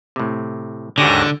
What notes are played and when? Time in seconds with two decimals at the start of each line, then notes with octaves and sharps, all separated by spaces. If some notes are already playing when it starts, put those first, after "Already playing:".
0.16 A2 C3
0.98 D#2 G#2 D3 C#4 F#4 G4 A#6